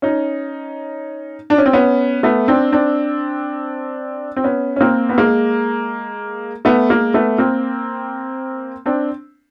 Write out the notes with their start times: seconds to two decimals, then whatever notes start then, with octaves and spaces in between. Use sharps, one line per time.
0.02 C#4 D#4
1.50 D4
1.58 C#4
1.66 C4
1.73 B3 C#4
2.23 A3 B3
2.48 C4 D4
2.72 C4 D4
4.36 C4
4.44 B3 C#4
4.76 C#4
4.81 A#3 C4
5.09 B3
5.18 G#3 A#3
6.65 A3 B3
6.90 G#3 A#3
7.14 A3 B3
7.38 A#3 C4
8.86 C4 D4